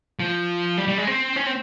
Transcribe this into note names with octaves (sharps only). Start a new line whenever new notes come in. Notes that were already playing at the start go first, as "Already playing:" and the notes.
F3
G3
G3
G#3
C4
C#4
C4